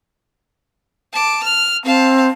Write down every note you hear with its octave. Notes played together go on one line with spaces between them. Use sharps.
A5 D6
F6
C4 F5 A5